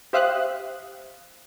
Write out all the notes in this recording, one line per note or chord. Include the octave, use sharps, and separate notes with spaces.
G4 C5 E5 F5 D#6 F#6